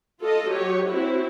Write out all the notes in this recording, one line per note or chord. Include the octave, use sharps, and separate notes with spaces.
F4 A4 D#5
F#3 G4 C#5
C4 E4 F#4